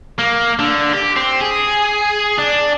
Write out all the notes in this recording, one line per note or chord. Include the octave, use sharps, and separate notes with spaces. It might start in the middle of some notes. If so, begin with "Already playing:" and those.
A#3
D3
G4
C4
G#4
D4